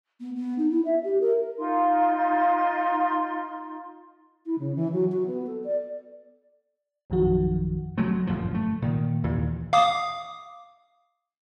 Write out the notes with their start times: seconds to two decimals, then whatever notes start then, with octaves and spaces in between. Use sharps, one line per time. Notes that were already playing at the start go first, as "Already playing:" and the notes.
0.20 B3
0.35 B3
0.58 D#4
0.70 E4
0.85 E5
1.03 G4
1.21 A#4
1.58 D#4 F4 C6
4.46 E4
4.59 C#3
4.76 E3
4.93 F#3
5.12 F#4
5.26 B3
5.47 A4
5.64 D5
7.10 A#1 F#2 D#3 F3 F#4
7.98 F#3 G#3 A3
8.27 G1 F#2 A#2 F3
8.54 A3
8.82 A#2 D#3
9.23 D#2 A#2 E3
9.73 F5 D6 D#6